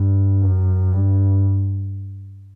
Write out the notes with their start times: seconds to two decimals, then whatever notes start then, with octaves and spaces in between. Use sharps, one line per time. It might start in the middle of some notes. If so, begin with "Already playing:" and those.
Already playing: G2
0.42 F#2
0.92 G2